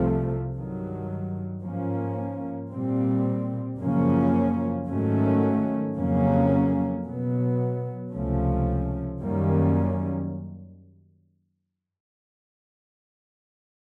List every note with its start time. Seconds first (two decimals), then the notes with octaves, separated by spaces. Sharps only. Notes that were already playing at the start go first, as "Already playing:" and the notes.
Already playing: C2 C3 F3 A3
0.54 G2 D#3 F#3
1.62 G#2 F3 A#3 C#4
2.70 A#2 G3 C4
3.78 F#2 C#3 F3 A#3 C#4
4.87 G#2 D#3 F#3 A3 C#4
5.95 F2 C#3 F#3 A#3 C#4
7.04 B2 F#3 B3
8.12 C#2 C3 F3 A3 C#4
9.21 F#2 D#3 G3 A#3 C#4